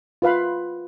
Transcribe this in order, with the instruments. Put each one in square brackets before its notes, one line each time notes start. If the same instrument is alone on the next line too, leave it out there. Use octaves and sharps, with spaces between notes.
[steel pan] F4 B4 F5 B5